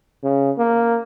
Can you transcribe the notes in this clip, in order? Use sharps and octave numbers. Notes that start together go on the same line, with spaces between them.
C#3
A#3